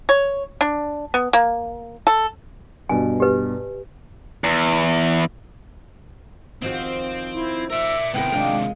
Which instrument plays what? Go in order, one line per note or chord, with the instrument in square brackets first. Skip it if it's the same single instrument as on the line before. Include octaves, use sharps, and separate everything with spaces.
[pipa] C#5
D4
B3
A#3
A4
[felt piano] G2 B2 [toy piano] G#5
[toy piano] G4 B4
[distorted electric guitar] E2
[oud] D#3 F3 F#4 [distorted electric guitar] C4
[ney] E4
[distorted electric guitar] A#4 D5 [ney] E5 [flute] E6
[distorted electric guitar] C3 D#3 [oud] B3 E4 A#4 [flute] G5
[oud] G#3 F4 A#4 [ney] D4